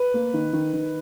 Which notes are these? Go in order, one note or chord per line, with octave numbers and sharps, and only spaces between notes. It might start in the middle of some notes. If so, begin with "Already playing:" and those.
Already playing: B4
A#3
D#3
D#3
D#3